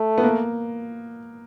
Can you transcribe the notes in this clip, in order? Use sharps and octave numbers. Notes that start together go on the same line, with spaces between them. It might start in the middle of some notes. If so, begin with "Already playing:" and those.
Already playing: A3
B3
A#3